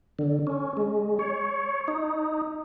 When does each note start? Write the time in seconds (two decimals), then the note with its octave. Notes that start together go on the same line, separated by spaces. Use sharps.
0.19 D3
0.47 C#4
0.77 G#3
1.19 C#5
1.88 D#4